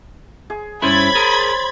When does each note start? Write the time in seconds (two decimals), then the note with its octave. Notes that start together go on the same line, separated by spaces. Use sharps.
0.50 G#4
0.82 G2 C#4 E4 C5 C#5 B5 G#6 A6
1.15 G#4 A#4